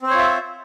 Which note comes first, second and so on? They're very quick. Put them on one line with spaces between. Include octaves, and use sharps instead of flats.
C4 C5 C#5 F4 E5